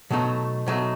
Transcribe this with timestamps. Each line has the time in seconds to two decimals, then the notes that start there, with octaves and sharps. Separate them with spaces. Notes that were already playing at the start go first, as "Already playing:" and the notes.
0.11 B2 F#3 A3 D#4
0.66 B2 F#3 A3 D#4